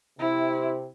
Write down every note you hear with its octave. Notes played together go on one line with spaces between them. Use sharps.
C3 E4